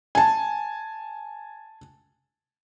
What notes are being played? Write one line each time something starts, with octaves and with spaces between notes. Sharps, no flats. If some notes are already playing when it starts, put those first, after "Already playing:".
G#5 A5